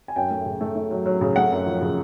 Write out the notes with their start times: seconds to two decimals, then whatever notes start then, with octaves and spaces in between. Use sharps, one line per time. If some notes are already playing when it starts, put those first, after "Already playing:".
0.08 G#5
0.16 F#2 G5
0.31 A3
0.45 C#3
0.61 A3
0.76 A3
0.91 F#3
1.06 F#3
1.21 C#3
1.36 A3 F#5
1.51 F#2
1.67 F3
1.81 C#3